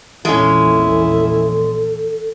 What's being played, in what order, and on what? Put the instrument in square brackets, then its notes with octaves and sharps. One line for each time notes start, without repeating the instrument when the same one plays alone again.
[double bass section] A#1 E2 A#2 [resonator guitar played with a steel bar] G#3 C#4 [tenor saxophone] E4 [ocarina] A4